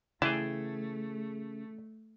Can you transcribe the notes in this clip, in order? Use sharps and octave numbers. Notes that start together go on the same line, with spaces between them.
C#3 E3 A3 G#4 G5 A5